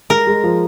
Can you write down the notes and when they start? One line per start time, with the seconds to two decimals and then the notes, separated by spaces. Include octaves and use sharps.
0.10 G#3 A#4
0.27 G#3
0.43 F3